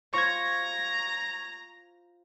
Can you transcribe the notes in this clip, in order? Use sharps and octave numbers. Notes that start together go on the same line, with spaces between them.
F4 C5 A#5 C#6 G#6